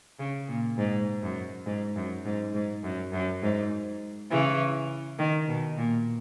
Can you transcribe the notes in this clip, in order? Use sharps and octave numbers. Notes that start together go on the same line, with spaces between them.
C#3
A#2
G#2
F#2
G#2
F#2
G#2
G#2
F#2
F#2
G#2
C#3 E3
D#3
B2
A#2